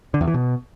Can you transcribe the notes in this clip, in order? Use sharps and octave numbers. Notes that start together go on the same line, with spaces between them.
D3
E2
E3
B2